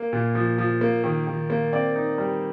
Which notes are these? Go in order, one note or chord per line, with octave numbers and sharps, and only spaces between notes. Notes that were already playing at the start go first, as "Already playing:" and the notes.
Already playing: A#3
A#2
F3
F3
A#3
D#3
D#3
A#3
C4 D5
D#4
G3